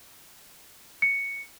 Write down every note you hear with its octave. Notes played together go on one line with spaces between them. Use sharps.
C#7